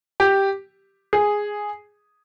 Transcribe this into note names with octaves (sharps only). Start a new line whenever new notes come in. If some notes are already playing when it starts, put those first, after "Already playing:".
G4
G#4